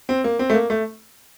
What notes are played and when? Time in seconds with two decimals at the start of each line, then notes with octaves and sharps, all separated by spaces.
0.09 C4
0.24 A#3
0.39 C4
0.50 A3
0.54 A#3
0.70 A3